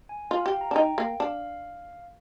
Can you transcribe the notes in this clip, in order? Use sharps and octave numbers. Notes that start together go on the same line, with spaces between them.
G#5
F4 F5
G4 G5
A#5
D4
D#4 G5
A#3
D4 F5